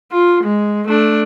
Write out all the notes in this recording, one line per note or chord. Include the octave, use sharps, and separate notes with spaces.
F4
G#3
A3 D4